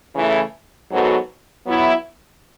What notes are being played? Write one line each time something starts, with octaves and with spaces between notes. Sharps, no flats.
C#3 E3 A3 E4
G#2 F#3 B3 F#4 A4
F#3 B3 E4